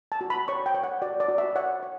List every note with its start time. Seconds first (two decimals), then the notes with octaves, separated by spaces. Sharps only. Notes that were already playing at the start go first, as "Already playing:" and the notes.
0.12 A5
0.21 F#4
0.30 B5
0.48 C#5 C#6
0.66 G5
0.74 C#5
0.84 F#5
1.02 F#4 D5
1.20 D5
1.29 F#4
1.38 E5
1.55 C#5 F#5
1.83 C#5